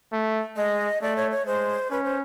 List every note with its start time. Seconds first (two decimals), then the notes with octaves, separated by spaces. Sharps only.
0.13 A3
0.56 G#3 D#5
1.02 A3 D5
1.16 C#5
1.31 C#5
1.46 G#3 C5
1.91 C#4 B4
2.04 C5